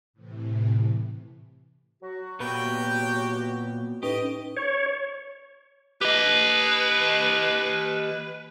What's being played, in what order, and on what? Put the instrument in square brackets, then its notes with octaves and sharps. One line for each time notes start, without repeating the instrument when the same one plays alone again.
[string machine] A2 C3 E3
[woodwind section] F#3 F#4
[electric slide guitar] A#2 B3 B4 [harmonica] G4 G5
[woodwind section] A2 [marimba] C#4 D#4 B4 [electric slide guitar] G4 [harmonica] D#5
[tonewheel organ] C#5
[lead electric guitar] G4 D#5 [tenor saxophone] B4